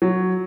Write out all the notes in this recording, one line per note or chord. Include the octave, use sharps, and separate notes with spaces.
F#3